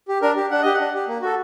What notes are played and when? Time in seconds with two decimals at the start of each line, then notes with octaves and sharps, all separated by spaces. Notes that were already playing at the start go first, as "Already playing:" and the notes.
0.08 G4
0.22 D4 A#4
0.36 G4
0.51 D4 F#5
0.62 G4 D#5
0.74 F#5
0.80 D4
0.94 G4
1.08 A#3
1.22 F#4 A4